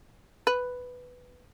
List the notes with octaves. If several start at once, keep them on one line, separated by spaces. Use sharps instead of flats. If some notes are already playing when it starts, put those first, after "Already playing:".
B4